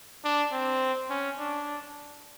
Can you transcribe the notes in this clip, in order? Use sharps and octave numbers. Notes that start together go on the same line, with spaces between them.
D4
C4
C#4
D4